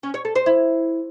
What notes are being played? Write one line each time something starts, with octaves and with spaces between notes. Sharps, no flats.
C#4
C#5
A4
C5
E4